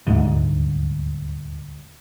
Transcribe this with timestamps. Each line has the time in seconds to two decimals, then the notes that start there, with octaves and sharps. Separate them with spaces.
0.07 D#1 D2 G#2